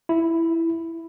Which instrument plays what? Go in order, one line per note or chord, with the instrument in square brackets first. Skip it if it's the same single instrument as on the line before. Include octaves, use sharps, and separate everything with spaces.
[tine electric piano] E4